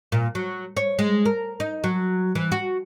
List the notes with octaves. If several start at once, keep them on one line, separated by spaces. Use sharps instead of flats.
A#2
F#3
C#5
G#3
A#4
D#4
F#3
E3
F#4